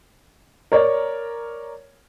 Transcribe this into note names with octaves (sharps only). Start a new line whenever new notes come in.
A#4 C#5 D5